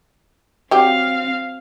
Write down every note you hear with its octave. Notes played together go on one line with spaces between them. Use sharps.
F#3 C4 G4 F5